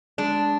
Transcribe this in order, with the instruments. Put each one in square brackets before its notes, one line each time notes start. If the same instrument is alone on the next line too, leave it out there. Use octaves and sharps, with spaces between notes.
[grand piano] G#3 [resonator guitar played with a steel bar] D4